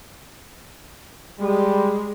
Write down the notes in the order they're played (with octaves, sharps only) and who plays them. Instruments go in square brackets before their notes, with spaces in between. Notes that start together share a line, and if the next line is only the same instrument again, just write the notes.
[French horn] G3 [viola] G#3